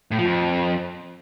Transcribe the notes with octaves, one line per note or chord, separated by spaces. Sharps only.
A2
F3
F2